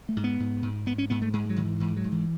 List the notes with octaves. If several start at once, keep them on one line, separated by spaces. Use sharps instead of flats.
A3
G#2
B3
G#2
G#2
G#2 B3
C#4
G#2 B3
A3
G#2 G#3
F#3
G#2 D#3
E3
G#2 E3
F#3
G#2
E3